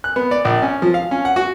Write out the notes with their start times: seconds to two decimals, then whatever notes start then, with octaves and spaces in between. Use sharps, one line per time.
0.04 F#6
0.16 B3
0.31 D5
0.45 A#1
0.62 C#4
0.82 F3
0.94 F5
1.11 C#4
1.25 F#5
1.36 F#4